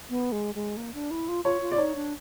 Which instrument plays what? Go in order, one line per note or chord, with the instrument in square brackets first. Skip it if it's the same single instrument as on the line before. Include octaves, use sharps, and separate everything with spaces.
[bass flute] B3
G#3
G#3
A#3
D4
E4
F4
[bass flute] F4 [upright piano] C#5
[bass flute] F4
[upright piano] D5
[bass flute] D#4 [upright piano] C#5
[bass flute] D4